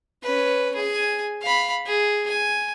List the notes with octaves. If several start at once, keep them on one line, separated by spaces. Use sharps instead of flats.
C#4 B4
G#4 G#5
F5 B5
G#4
G#5